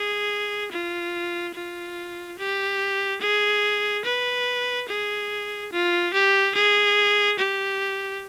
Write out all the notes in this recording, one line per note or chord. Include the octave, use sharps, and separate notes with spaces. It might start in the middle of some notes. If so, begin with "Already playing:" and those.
Already playing: G#4
F4
F4
G4
G#4
B4
G#4
F4
G4
G#4
G4